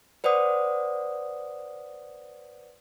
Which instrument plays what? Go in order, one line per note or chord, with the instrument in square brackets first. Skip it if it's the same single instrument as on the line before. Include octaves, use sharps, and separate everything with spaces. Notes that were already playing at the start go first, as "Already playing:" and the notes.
[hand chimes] B4 C5 D5 F#5 D#6